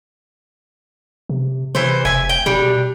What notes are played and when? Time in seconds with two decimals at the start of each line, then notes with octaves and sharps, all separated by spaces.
1.29 C3
1.75 C3 E3 C5
2.05 F1 E5 G#5
2.29 G5
2.46 B2 G3 D4